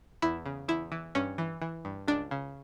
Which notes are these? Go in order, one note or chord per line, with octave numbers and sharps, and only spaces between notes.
E2 E4
C#3
E2 E4
E3
G2 C#4
E3
E3
G2
C#2 D4
C#3